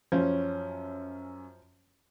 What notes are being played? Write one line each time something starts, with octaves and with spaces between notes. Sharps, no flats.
F#2 F3 C#4